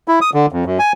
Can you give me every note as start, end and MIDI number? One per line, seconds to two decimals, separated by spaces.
0.08 0.19 64
0.21 0.30 87
0.34 0.46 50
0.52 0.64 41
0.66 0.78 42
0.79 0.92 80